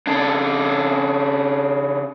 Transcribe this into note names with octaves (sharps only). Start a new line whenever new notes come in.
C#3 D4